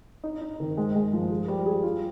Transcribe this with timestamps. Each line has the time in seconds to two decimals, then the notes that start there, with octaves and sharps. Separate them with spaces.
0.24 D#4
0.41 D#4
0.60 D#3
0.77 G#3
0.95 G#3
1.13 F3
1.30 G#4
1.48 G3
1.66 G#4
1.84 F4